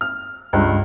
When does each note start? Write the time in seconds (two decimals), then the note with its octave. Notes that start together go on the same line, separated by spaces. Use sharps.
0.01 F6
0.53 C#2 G2